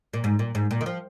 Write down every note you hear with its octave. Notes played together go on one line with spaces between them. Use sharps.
A#2
G#2
A#2
G#2
A#2
D#3
F3